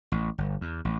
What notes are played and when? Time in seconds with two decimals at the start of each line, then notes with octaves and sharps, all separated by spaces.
0.12 A1
0.38 G1
0.61 E2
0.85 A1